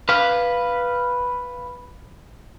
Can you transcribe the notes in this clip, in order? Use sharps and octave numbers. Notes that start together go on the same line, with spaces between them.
B4 F5